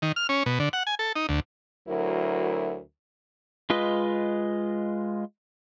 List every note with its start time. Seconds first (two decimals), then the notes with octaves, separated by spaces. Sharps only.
0.02 D#3
0.16 F6
0.29 C#4
0.46 B2
0.60 D3
0.73 F#5
0.87 G#5
0.99 A4
1.16 D#4
1.29 D2
1.87 D2 F#3 E4 A#4
3.70 G#3 F4 B4 D#5